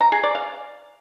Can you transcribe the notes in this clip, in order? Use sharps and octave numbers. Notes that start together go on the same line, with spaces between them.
A#5
G#4
D5
F5